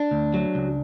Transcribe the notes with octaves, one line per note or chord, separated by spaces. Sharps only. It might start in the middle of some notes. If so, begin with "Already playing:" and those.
Already playing: D4
D2
F#3
C#2